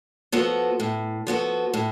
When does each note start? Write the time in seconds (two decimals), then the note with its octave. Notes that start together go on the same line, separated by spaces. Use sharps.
0.32 F3 B3 F#4 A4
0.80 A2
1.27 F3 B3 F#4 A4
1.74 A2